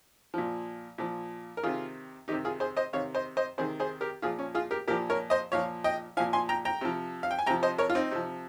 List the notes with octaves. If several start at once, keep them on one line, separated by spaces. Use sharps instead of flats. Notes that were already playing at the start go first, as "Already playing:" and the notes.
A#2 F3
A#2 F3
A#4
C3 D#3 F4 G#4
C3 D#3 D#4 G4
F4 G#4
G#4 C5
C5 D#5
C3 D#3 C#5 F5
C5 D#5
C5 D#5
C3 D#3 G#4 C5
G#4 C5
G4 A#4
A#2 F3 F4 G#4
C#4
F4 G#4
G4 A#4
A#2 F3 G4 A#4
A#4 C#5
C5 D#5
A#2 F3 C#5 F5
D#5 G5
A#2 F3 F5 G#5
G#5 C6
G5 A#5
G5 A#5
C3 F3
F5
G5
G#5
C3 F3 G5 A#5
C5 D#5
A#4 C#5
F4
C4 D#4
C3 F3